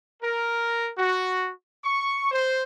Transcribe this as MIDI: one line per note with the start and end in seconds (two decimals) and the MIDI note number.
0.23 0.90 70
0.97 1.50 66
1.84 2.29 85
2.31 2.63 72